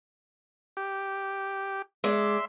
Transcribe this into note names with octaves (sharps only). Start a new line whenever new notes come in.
G4
G#3 D5 E5 C6